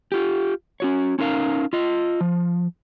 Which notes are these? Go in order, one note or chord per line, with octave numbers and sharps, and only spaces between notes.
F4 G4
C#4 F#4 C#5
C#4 D#4 A#4 F5
F4 D#5
F3